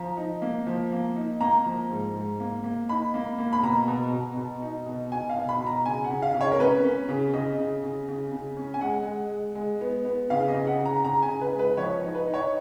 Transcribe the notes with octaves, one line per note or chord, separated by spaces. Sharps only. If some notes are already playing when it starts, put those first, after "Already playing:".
Already playing: F3 A#5
D#4
A#3
F3
A#3
D#4
A#3 A#5
F3
G#2
G#2
A#3
A#3
D#4 B5
A#3
A#3
B5
B2 A#5
B2
B2
B2
D#4
B2
B2 G#5
F5
B2
B5
B2
A#5
C#3 G#5
F#5
C#3
F5
C#3
C#5
A#4
C#4 B4
C#4
C#3
C#3 D#5
C#3
C#3
C#3
C#3
C#4
G#5
G#3 F#5
G#3
G#3
G#3
B3
B3
C#3 F5
D#5
C#3
F#5
C#3
A#5
C#3 A#5
G#5
C#3
B4
G#3
B4
F3 C#5
D#4
B4
D#4
C#5